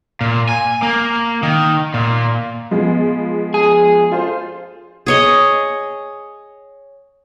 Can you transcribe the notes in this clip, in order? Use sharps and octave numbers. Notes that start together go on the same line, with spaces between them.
A#2
G#5
A#3
D#3
A#2
F3 G#3 B3
G#4
F4 A4 C5
G#4 C#5 D#5